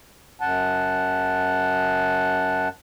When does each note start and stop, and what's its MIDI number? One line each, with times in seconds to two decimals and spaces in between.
0.41 2.68 42
0.41 2.68 78
0.41 2.68 81